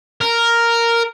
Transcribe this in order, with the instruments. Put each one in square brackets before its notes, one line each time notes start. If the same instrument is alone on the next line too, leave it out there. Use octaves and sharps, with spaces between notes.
[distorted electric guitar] A#4